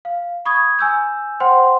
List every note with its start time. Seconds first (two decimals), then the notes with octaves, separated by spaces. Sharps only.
0.05 F5
0.45 B5 C#6 D#6 G#6
0.79 G#5 E6 G6
1.40 C5 F#5 G5 C6